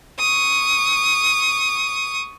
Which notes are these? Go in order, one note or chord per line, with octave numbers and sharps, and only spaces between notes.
C#6 D#6